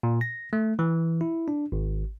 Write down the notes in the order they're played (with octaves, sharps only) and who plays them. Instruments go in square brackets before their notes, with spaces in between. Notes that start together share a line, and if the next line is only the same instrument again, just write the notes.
[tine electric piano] A#2
A#6
A3
E3
E4
D4
G#1